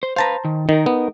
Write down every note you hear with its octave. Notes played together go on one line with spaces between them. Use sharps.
C5
B4 C5 F5 A5 A#5
D#3
D#3 D#4 A#4
B3